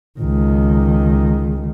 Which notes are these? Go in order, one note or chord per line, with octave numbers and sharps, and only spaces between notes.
C#2 D#3